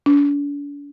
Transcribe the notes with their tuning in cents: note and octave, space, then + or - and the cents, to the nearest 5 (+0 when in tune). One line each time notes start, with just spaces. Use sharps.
D4 -40